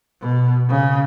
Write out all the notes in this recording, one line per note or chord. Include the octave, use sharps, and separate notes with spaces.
B2
C#3